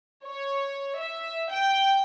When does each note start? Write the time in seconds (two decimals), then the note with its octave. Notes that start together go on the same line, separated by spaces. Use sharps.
0.24 C#5
1.00 E5
1.50 G5